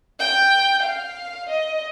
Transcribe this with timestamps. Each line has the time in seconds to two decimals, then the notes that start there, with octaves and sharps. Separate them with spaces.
0.19 G5
0.82 F5
1.49 D#5